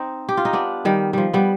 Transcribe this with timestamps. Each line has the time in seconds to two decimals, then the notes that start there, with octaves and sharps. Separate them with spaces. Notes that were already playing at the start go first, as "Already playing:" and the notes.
Already playing: C4 D#4
0.29 G4
0.37 F4
0.45 D#4
0.53 B3 D4
0.85 D#3 G3
1.13 F3 G3
1.33 G3 B3